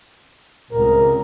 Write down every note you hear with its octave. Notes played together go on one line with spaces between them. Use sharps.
C#2 C3 A#4